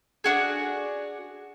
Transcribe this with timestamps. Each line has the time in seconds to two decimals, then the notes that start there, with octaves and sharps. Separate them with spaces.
0.24 D4 F#4 G#4